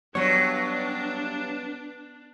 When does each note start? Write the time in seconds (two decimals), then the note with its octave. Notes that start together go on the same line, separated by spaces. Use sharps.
0.15 G2 F#3 B3 D4 C#5